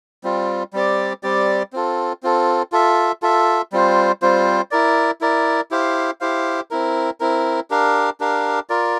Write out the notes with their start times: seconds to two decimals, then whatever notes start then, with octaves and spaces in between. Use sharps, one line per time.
0.24 G3 C4 F4
0.73 G3 C4 G4 D5
1.23 G3 C4 G4 D5
1.73 C4 F4 A4
2.23 C4 F4 A4
2.72 F4 A4 E5
3.22 F4 A4 E5
3.72 G3 C4 F4 C5
4.22 G3 C4 F4 C5
4.71 E4 A#4 D5
5.21 E4 A#4 D5
5.71 E4 G4 C5 F5
6.21 E4 G4 C5 F5
6.71 C4 E4 A#4
7.20 C4 E4 A#4
7.70 D4 G4 A#4 F5
8.20 D4 G4 A#4 F5
8.70 F4 A#4 D5